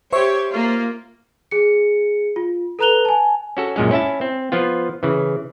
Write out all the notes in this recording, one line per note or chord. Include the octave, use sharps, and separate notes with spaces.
G4 C5 C#5 E5 C#6
A#3 F4
G#4 C#7
F4
A4 B4 A#5 F#6 F7 G7
G#5 A5
C#4 F#4 A4
F#2 A#2 G#3 C#4
C#4 E4 E5 A5
C4
F3 B3 F4
C#3 E3